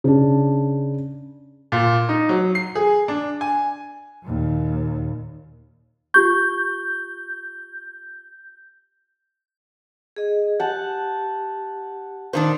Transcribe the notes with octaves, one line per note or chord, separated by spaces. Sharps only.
C#3 D4
A#2
D#4
F#3
C7
G#4
D4
G#5
D#2 A#2
F4 G4 C#6 G6
G#4 D#5
G4 F#5 A5
A#2 D#3 D4 C5